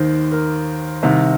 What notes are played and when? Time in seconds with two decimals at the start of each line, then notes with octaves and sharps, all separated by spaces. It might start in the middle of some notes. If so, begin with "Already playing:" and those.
Already playing: D#2 D#3 C5
0.32 A#4
1.03 C2 C3 D#3